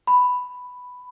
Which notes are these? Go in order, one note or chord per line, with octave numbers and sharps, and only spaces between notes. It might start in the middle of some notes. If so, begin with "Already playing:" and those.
B5